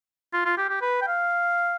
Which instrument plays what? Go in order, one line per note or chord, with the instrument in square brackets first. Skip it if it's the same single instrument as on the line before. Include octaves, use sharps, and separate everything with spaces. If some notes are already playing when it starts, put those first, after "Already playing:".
[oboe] F4
F4
G4
G4
B4
G5
F5